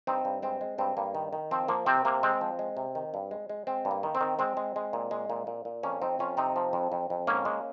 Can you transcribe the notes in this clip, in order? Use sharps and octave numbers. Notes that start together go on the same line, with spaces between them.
G2 C4 D#4
G2
G#3 C4
G#3
G2 C4
G2 A#3
D#3
D#3
F3 C4
F3 A#3
C3 C4
C3 A#3
G#3 C4
F3
G#3
C3
D#3
G2
G#3
G#3
G#3 C4
G2
A#3
D#3
C4
D#3
G#3 C4
G#3
G#3
A#2
G#3
A#2
A#2
A#2
F2 A#3 C#4
F2 C4 D#4
F2 C#4 F4
C3 C4 D#4
F3
F2
F2
F2
G#2 A#3 C#4
G#3